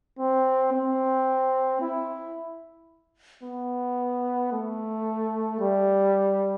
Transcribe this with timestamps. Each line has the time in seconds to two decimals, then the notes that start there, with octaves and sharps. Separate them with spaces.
0.19 C4
0.72 C4
1.81 E4
3.43 B3
4.53 A3
5.60 G3